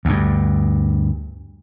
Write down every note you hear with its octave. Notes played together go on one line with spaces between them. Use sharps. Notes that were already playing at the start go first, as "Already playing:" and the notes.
D2 G2